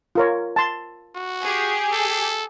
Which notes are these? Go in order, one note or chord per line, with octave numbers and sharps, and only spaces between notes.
F4 A#4 C#5
A5 C6
F#4
G4 G#4
A4